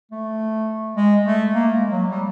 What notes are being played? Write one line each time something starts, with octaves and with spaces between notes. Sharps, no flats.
A3
G#3
A3
A#3
G#3
F#3
G3